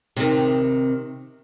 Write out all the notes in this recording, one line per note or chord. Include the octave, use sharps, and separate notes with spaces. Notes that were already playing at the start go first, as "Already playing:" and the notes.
C3 D#3